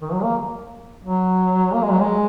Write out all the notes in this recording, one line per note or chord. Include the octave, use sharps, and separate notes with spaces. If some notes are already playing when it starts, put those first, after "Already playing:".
D#3
F#3
A#3
F#3
A#3
G#3
F#3
G#3